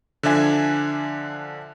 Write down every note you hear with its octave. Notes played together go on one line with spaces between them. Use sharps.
D3 F3 D4 E5 G#5